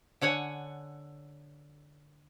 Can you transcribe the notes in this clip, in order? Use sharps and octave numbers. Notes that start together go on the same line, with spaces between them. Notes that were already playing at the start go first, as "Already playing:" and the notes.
D3 C#5 F#5 G#5